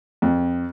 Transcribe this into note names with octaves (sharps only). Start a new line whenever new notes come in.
F2